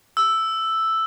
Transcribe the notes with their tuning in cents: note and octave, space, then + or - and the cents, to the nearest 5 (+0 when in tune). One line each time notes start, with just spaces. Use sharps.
E6 +0